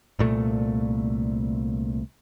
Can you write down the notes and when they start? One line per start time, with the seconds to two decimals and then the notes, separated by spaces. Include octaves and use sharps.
0.19 C2 A#2 A3